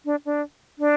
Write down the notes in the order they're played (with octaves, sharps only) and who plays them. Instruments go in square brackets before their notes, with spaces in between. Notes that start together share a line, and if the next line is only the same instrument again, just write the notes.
[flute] D4
D4
D4